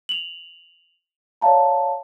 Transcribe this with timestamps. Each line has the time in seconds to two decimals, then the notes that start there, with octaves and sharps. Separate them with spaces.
0.09 F7 F#7
1.41 C#5 D5 E5 F5 A5 A#5